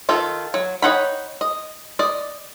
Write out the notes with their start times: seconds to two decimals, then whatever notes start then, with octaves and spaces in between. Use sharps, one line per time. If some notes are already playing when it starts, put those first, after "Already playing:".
0.09 D#3 F4 A4
0.54 F#3
0.82 D#4 C#5 F#5 G5 B5
1.41 D#5
1.99 D5 D#5